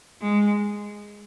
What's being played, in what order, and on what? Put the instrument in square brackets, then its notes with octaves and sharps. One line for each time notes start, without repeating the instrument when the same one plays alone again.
[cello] G#3